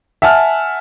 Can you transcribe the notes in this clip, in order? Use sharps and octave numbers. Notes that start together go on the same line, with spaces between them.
E5 F#5 G#5 A5 F6